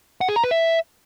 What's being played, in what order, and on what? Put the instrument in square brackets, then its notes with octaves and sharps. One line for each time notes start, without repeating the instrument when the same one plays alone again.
[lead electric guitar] F#5
G#4
A#5
B4
E5